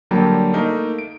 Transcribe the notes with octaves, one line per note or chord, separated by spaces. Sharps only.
D3 F#3 G3 A#3 G5 A5
A3 A#3 D#4 A#4
D7